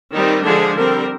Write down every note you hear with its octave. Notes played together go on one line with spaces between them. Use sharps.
D#3 G3 C4 D#4
D3 F3 G#3 D4 G#4
D3 G3 C4 A#4